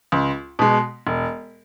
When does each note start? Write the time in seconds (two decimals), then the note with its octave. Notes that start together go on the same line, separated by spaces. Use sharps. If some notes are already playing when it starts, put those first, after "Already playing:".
0.12 C#2
0.59 B2 G#3
1.07 E1